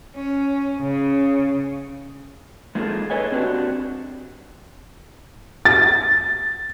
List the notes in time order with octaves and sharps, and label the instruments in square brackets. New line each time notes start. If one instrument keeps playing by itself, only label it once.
[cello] C#4
C#3
[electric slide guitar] G#3 A#3 D#4 F4 G#4 A4
G#4 A4 B4 C#5 D#5 G#5
C4 D4 F#4 G4
[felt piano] A6